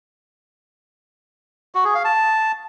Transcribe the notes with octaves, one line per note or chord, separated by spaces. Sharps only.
F#4
G#4
F5
A5